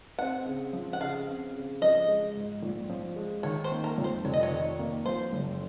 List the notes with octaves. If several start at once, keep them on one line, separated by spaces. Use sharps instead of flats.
C4 F#5
C#3
F3
F#5
C#3 F5
C4
C#3
F3 D#5
G#3
G#2
A#1
F3
G#3
D#3 C#5
C5
A#3
A#4
F2
C5
F1 C#5
D#5
C#5
D#3
A#3
F3 C5
F#1